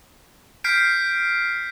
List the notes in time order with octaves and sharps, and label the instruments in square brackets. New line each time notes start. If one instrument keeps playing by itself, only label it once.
[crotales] F6 G6 B6 C7 D7